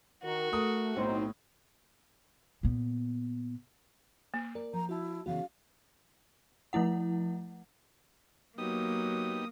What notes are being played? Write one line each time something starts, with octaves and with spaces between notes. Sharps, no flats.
D#3 F#4 A#4
A3 A#4 D#6
B1 A2 F#3 C4 D#4 C5
A#2 B3
A#3
A#4 D5
F3 A#5
E4 F#4 A5
C#3 E3 B3 F#4 F5
F3 A3 E4 F#5
F#3 A#3 B3 D#4 G4 D#6